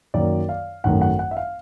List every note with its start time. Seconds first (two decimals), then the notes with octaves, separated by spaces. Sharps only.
0.14 F#2 D#3 F#3 A#3 D5
0.49 F5
0.84 G#1 F#2 D#3 F#3 A3 F#5
1.01 F#5
1.19 F#5
1.31 E5
1.37 F5